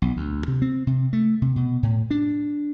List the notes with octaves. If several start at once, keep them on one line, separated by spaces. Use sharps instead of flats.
B1
D2
C3
C4
C3
A3
C3
B2
A2
D4